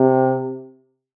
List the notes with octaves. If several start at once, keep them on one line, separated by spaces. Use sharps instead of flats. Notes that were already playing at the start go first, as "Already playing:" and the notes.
Already playing: C3